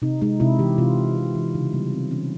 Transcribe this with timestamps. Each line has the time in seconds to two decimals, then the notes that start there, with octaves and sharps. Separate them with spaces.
0.02 C3 D#4
0.22 G#3 D#4
0.40 C3 E4
0.59 E3 G4
0.78 C3 F4
0.98 G#3
1.17 C3
1.35 E3
1.55 C#3 D#4
1.73 G3 B3
1.92 C#3 C4
2.11 E3 C#4